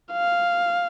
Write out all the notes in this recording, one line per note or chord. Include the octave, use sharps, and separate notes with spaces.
F5